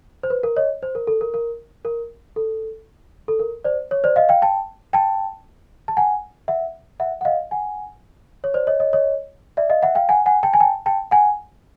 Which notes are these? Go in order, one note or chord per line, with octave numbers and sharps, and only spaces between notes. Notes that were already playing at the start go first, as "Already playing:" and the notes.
C5
B4
A#4
C#5 D#5
C5
A#4
A4
A#4
A#4
A#4
A4
A4
A#4
C5 D5
C#5
C5 D5
D#5 F5
F5 G5
G5 A5
G5 A5
A5
F#5 G#5
E5 F#5
E5 F#5
F#5
D#5 F5
F#5 G#5
C#5
C5 D5
C#5 D#5
C#5 D#5
C#5 D#5
D5 E5
D#5 F5
E5 F#5
F5 G5
F#5 G#5
F#5 G#5
G5 A5
G#5
G5 A5
G5 A5
F#5 G#5